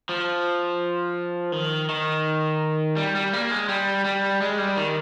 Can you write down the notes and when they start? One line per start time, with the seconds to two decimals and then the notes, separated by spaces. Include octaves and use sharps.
0.09 F3
1.52 D#3
1.89 D#3
2.97 G3
3.15 G3
3.33 A#3
3.51 G#3
3.69 G3
4.05 G3
4.41 G#3
4.58 G3
4.77 D#3